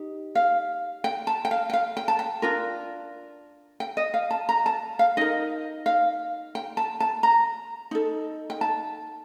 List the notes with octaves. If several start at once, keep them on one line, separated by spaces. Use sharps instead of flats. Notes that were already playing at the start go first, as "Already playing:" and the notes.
Already playing: D#4 G4
F5
G5
A5
G5
F5
G5
F5
G5
A5
G5
D4 F4 A#4
G5
D#5
F5
A5
A#5
A5
F5
D#4 A#4 D#5
F5
G5
A5
A5
A#5
D#4 A4
G5
A5